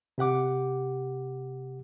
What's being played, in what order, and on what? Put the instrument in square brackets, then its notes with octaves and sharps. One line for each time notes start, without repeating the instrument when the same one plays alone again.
[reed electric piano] C3 G4 F#5 D6